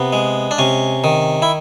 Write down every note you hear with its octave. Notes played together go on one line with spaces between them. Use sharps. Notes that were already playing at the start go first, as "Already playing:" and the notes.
Already playing: C3 B3
G#3
D4
C3 C#4
D#3
E4